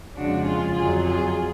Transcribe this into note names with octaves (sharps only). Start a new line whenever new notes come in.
F2 C#3 F3 G#3 D4 F#4
F4 G#4
F2 D3 F#3 F4 G#4
F4 G#4